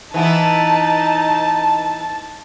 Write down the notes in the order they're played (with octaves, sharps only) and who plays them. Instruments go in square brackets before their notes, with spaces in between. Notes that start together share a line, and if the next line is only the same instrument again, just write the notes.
[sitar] E3 B3 E4 [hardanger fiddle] D#4 [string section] A5